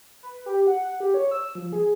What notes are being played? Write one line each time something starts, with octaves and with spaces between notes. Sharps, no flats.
B4
G4
F#5
G4
C#5
E6
F3
G#4